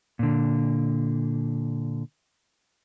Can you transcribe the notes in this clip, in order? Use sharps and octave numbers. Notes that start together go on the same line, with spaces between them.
A#2 D3